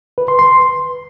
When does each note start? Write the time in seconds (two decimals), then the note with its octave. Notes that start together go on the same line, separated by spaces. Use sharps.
0.18 B4
0.28 C6
0.39 C6